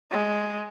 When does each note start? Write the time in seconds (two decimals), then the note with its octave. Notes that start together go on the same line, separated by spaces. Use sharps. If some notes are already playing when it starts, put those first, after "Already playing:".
0.11 G#3